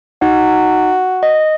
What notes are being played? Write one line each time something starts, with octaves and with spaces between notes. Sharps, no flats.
D#4 F#4
D#5